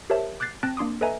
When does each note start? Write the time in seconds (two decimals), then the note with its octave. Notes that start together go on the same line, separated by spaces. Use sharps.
0.10 G4 A#4 C5 C#5 E5 A5
0.40 D6 F#6 G6 A6 C7
0.63 C4 G5 A5 F#6 A6 A#6
0.77 A#3 D4 C6 D6 D#6
1.01 A4 B4 D#5 E5 G#5 A#5